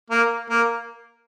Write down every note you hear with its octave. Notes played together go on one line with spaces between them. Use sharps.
A#3
A#3